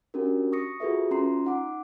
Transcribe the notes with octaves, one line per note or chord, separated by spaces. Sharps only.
C#4 D4 F#4 G4 A#4
C#6 D#6 A#6 C#7
F4 F#4 G#4 A4 B4 E5
C#4 F4 A#5 C6 C7
D#4 F#5 D6